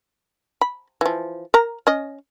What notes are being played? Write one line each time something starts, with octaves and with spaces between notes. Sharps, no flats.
B5
E3 F3
A#4 A#5
C#4 D#5